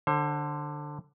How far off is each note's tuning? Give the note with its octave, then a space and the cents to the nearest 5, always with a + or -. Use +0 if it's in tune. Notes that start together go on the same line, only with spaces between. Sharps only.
D3 +10 C5 +40